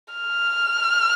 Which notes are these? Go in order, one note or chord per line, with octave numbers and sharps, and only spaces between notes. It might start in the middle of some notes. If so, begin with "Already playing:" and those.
F6